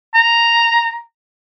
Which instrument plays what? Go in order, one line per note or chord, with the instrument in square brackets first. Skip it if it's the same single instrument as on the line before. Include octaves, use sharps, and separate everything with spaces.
[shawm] A#5